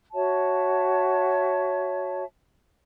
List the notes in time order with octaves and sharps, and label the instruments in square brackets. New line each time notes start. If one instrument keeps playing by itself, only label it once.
[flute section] F#4 C#5 E5 A5